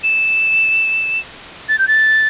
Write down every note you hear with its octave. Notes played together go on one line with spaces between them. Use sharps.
E7
A6
G6
A6